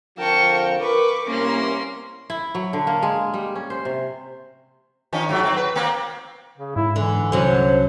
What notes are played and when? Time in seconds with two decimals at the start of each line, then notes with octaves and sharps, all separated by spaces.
0.18 F2 D3 F3 A#4 G5 A5 C#6
0.81 A#4 B4 C#6 D6
1.27 C2 A#3 C#4 C6
2.30 E4
2.55 F#3
2.73 D3
2.87 A#3
3.02 G#3
3.34 G3
3.55 C#4
3.70 C5
3.85 C3
5.13 D#3 F3 C#4
5.29 G#2 F#3 A3
5.43 F#3 C4
5.57 B4
5.76 A#3 C4
6.58 C#3
6.76 G#2 E4
6.96 D3 E3
7.32 C2 D3 F#3 C#4 C5